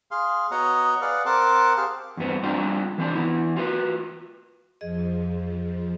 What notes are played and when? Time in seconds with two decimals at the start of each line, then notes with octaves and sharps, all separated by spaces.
0.11 G#4 F5 C6
0.51 B3 F#4 C#5 D#5 F#5 A#5
1.01 G#4 B4 D5 F5 F#5
1.26 C4 A#4 F#5 A5 C6 D6
1.77 G4 G#4 C5 F5
2.17 E2 G2 B3 C4
2.43 G3 C4 D4 F4 G5
2.98 E3 C4 D4
3.15 E3 B3 E4
3.56 F4 F#4 B4
4.81 F2 F3 G#4 D#5